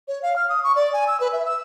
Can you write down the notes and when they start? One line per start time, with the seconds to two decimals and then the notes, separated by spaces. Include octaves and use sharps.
0.08 C#5
0.23 F5
0.36 F6
0.49 D#6
0.64 C#6
0.76 D5
0.93 G#5
1.07 E6
1.20 B4
1.33 E5
1.45 E6